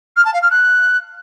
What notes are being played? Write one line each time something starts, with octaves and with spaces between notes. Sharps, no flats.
F6
A5
F5
F6
F#6